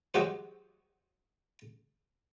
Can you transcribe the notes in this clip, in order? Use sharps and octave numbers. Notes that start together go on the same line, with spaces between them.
F#3 G#3 F#4 G4 C5